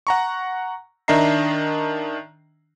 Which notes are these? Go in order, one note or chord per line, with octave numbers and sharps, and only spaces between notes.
F#5 A#5 C#6
D#3 D4 D#5 E5 A#5 C7